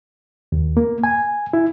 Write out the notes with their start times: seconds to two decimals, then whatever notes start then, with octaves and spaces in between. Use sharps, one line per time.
0.52 D#2
0.77 A#3
1.04 G#5
1.53 E4